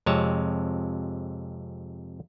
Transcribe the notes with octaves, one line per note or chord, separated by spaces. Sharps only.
F2 C3 G#3 C#5 A5